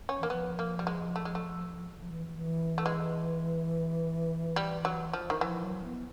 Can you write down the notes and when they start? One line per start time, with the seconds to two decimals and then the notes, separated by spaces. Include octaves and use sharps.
0.09 C#4
0.19 E3 A#3
0.30 F3 B3
0.59 A#3
0.79 G3
0.87 G#3
1.16 A3
1.25 G#3
1.35 A3
2.01 F3
2.10 E3
2.31 E3
2.78 A3
2.86 G#3
4.56 G3
4.85 F#3
5.13 F3
5.30 D#3
5.41 E3 F3
5.63 F#3
5.84 B3